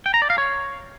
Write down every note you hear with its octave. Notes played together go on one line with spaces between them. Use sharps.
G5
A#5
D5
F5
C#5